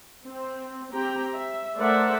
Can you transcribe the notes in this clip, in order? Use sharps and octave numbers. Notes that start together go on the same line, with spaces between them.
C4
C4 G4 G5 A#5
E5
A3 A#4 C5 D5 E5 F#5